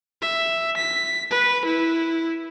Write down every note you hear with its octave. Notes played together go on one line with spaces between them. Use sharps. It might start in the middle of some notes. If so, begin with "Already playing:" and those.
E5
B6
B4
E4